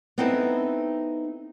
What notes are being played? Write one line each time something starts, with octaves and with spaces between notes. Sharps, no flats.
B3 C4 D#4 E4 A4 A5